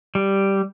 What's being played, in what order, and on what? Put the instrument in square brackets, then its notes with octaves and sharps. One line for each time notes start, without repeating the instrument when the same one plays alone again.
[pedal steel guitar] G3